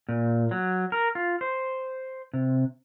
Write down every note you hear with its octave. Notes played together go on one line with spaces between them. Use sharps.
A#2
F#3
A#4
F4
C5
C3